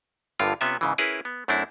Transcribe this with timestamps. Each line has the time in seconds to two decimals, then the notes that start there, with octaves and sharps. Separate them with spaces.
0.39 G1 G2 D3 A#3 F4 A#4
0.61 C3 B3 C#4 F4 E5
0.81 G#2 C#3 E3
0.98 C#4 E4 G#4 A#4 B4
1.25 B3
1.48 F#2 A3 C4 D4 E4